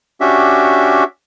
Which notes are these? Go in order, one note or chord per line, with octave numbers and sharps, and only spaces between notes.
C#4 D4 F#4 G4 E5